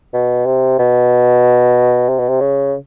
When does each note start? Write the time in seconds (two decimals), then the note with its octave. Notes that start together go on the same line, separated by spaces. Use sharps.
0.14 B2
0.46 C3
0.79 B2
2.09 C3
2.19 B2
2.29 C3
2.41 C#3